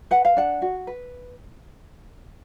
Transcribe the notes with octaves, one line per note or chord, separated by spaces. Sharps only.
B4 F#5
F5
D4 F#5
F#4
B4